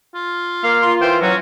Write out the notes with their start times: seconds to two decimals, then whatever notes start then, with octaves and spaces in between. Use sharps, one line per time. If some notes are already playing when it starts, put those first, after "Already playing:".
0.15 F4
0.64 A#3 F5
0.82 F4 C6
1.01 E3 C5 G5
1.22 F#3 C#4 F#4